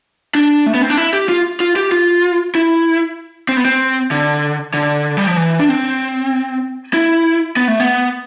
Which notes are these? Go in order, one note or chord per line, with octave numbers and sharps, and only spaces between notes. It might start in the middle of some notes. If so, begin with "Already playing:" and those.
D4
A3
B3
C4
D4
E4
G4
F4
F4
G4
F4
E4
C4
B3
C4
D3
D3
G3
F3
E3
D4
C4
E4
B3
A3
B3